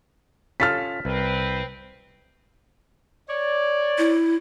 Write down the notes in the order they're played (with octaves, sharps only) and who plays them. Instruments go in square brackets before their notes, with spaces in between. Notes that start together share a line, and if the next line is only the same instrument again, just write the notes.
[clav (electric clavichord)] C#4 F4 A4 [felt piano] F6 A6 B6
[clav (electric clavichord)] C2 [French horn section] C4 B4
[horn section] C#5 D5
[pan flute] E4